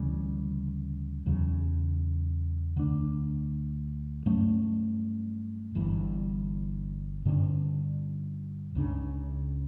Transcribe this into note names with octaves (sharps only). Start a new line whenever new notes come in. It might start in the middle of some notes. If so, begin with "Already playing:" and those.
Already playing: D2 C#3 E3 G3
E2 C#3 F#3
D2 D3 A3 D4
G2 F#3 A3 C#4
G1 G2 E3
G2 D3 A3 C#4
C#2 C#3 G3 D4